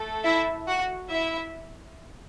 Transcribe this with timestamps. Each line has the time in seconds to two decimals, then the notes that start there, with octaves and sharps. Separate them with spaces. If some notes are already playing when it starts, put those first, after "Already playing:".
Already playing: A3 A4
0.24 E4 E5
0.67 F#4 F#5
1.10 E4 E5